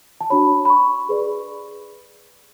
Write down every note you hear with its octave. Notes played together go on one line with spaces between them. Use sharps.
A5
D4 F#4 C#5 B5
B5
C#6
G#4 B4 D5